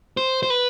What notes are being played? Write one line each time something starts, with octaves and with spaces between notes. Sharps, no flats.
C5
C5
B4